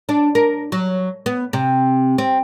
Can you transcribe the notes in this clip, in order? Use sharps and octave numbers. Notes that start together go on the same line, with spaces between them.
D4
A#4
F#3
B3
C3
C4